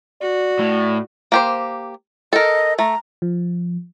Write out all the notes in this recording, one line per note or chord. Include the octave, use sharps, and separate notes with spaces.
F#4 D5
A2
A#3 G4 C5
A4 A#4 D#5
A3 A#5
F3